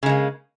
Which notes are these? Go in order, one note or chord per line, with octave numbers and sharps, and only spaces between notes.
C#3 G#3 A#3